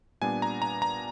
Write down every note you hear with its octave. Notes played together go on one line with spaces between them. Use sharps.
A#2 G3 B3 D4 G#5
A#5
A#5
A#5